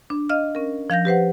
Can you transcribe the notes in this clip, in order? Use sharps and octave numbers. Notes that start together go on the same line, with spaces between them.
D4
D#5 F5 F6
C#4 A#4
F3 F5 G6 A#6
G4 B4 C5 F#5